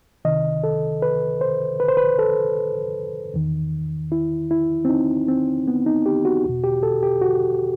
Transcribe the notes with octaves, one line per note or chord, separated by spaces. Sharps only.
C2 C3 D#3 D#5
A4
B4
C5
B4
C5
B4
A4
E2 D#3
E4
E4
C4
D#4
C4
B3
D#4
G4
F#4
E2 B2 F#4
G4
A4
G4
F#4